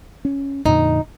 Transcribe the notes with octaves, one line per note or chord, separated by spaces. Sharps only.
C#4
F2 A#2 D3 D#4